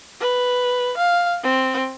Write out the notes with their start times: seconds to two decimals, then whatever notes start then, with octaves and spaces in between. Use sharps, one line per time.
0.21 B4
0.98 F5
1.44 C4